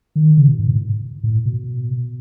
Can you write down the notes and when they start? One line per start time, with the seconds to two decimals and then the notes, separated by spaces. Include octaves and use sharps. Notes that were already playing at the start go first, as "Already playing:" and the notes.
0.16 D#3
0.37 C#3
0.47 B2
0.59 G#2
0.69 A2
1.24 A2
1.46 B2